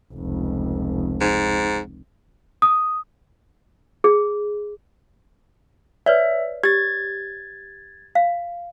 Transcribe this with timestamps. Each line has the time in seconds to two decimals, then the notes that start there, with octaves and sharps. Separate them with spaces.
0.14 F1 C#2
1.21 G#2
2.62 D#6
4.04 G#4
6.06 B4 C#5 D5 E5
6.64 G4 G#6 A6
8.15 F5